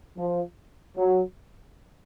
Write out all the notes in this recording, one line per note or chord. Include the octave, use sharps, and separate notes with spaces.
F3
F#3